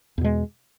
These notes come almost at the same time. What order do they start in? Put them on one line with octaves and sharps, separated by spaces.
E2 B2 G#3